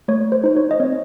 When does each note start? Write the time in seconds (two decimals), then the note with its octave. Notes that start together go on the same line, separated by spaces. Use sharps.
0.08 A3 C#5
0.32 C5
0.44 D#4 C5
0.56 C#5
0.71 D#5
0.80 C4 C#5